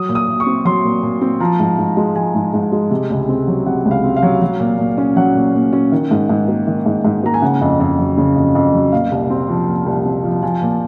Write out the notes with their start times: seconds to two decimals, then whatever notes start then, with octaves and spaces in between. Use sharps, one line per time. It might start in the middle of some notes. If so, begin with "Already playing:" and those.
Already playing: F#3 D#6
0.09 A#2
0.15 D#6
0.28 A#2
0.40 C#6
0.46 C4
0.65 F#3 C6
0.84 A#2
1.03 A#2
1.21 C4
1.40 F3 A#5
1.59 G#2
1.78 G#2
1.97 G#3
2.15 F3 G#5
2.35 G#2
2.53 G#2
2.72 G#3
2.91 C3
3.10 C#2
3.29 C4
3.47 F#3
3.66 C3 F#5
3.85 C#2
3.91 F5
4.04 C4
4.16 F5
4.23 F#3
4.42 F#3
4.60 A#2
4.78 A#2
4.98 C#4
5.16 F#3 F#5
5.35 A#2
5.54 A#2
5.73 C#4
5.92 D#3
6.11 G#2
6.29 G#2
6.48 A#3
6.67 D#3
6.86 G#2
7.04 G#2
7.23 A#3 A#5
7.34 G#5
7.42 C#3 F#5
7.61 F2
7.80 F2
7.98 F#3
8.18 C#3
8.36 F2
8.55 F2
8.74 F#3
8.92 A#2 F5
9.11 C2
9.30 C4
9.49 F3
9.68 A#2
9.86 C2
10.05 C4
10.24 F3
10.43 F3 G#5
10.62 A#2